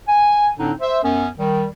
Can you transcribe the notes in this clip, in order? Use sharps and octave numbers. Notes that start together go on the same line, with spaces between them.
G#5
A2 D3 C4 D4 D#4
C5 E5
F#2 B3 C#4
D#3 G3